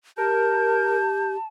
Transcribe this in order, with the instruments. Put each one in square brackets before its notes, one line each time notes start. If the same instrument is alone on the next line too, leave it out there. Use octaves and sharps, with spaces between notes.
[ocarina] G4 [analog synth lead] A#4 [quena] A5 [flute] G6